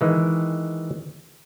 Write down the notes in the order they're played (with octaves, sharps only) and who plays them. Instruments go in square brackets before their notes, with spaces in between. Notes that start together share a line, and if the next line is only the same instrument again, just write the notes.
[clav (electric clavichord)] D#3 E3 G#3